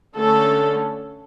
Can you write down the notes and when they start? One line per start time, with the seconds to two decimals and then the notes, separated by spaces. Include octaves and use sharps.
0.16 D3 A3 C#4 A4